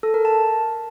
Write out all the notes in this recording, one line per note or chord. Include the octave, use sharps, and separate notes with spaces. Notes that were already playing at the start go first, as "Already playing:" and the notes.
A4
A#4
A5